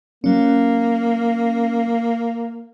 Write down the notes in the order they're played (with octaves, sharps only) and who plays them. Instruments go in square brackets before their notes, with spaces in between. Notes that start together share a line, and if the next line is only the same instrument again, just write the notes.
[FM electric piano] F#3 C#4 [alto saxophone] A#3